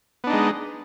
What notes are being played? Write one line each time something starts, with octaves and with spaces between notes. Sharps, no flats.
G#3 B3 D4 D#4